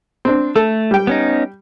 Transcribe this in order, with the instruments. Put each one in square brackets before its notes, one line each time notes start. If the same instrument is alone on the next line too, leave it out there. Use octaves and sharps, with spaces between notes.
[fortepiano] C4 D4
[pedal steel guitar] A3 [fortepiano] A4
[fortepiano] G3 G5
[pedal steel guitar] B3 C#4 D#4